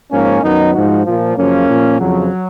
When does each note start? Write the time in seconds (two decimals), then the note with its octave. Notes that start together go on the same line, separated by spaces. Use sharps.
0.11 G#2 F3 A#3 C#4
0.42 F#2 D#3 B3 D#4
0.74 G#2 F3 D#4 F#4
1.05 A#2 F3
1.36 F#2 C#3 F3 A#3 C#4
1.68 A#2 F3
1.99 F2 C#3 F3 F#3